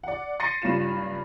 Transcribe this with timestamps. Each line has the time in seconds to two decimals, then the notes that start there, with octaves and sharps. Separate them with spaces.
0.03 D5 F#5
0.40 C6 A6 A#6 C7 C#7 D#7
0.62 F#1 G2 C#4 F4 E7